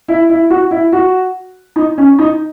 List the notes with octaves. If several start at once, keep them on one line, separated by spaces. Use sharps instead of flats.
E4
E4
F#4
E4
F#4
D#4
C#4
D#4